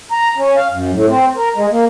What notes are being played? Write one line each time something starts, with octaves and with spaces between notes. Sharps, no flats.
A#5
C#4
F5
F#2
A2
C4
A#4
G#3
A#3